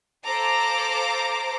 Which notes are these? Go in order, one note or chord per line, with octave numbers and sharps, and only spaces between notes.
A4 C5 F5 A#5 D6